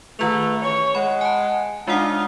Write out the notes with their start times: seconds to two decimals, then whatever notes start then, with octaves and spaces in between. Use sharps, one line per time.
0.19 D#3 A3 F4 B4 F7
0.63 E3 C#4 C#5 C#6
0.95 G#3 F#5 B5
1.21 G#5 A5
1.88 G#3 D4 D#4 F4 F#5 D#6